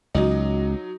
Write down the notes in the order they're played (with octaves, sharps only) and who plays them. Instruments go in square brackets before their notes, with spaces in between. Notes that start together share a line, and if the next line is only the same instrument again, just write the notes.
[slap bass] C#2 [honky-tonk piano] F#3 D#4